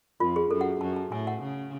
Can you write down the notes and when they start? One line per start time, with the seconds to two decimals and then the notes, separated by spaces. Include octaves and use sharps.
0.20 F2 F4
0.36 G#4
0.51 F#2 A4
0.61 F#5
0.81 F#2 A5
0.96 A5
1.12 A2 G#5
1.27 F#5
1.42 C#3